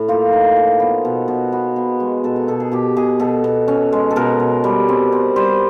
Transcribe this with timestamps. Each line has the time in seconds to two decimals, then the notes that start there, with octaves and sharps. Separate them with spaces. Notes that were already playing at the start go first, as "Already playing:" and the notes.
Already playing: A2
0.08 A#3 F4
0.33 D#4
0.56 F3
0.80 B3
1.05 B2
1.28 B2 F#4
1.52 B3 F#4
1.76 B3 G#4
2.00 G#3
2.24 B2 A4
2.36 A#4
2.48 B2 A4
2.60 G#4
2.72 B2 G4
2.96 B2 G#4
3.20 B2 A4
3.44 B2
3.68 C#4
3.92 G#3
4.11 A4
4.16 B2 A#4
4.40 B2
4.64 G3
4.88 C4
5.12 C4
5.36 G3 C5